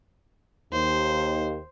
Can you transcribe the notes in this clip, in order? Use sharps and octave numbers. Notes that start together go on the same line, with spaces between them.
D#2 C5